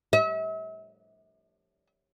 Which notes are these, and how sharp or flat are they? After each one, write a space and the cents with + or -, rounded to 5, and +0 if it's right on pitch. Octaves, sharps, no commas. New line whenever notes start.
E5 -40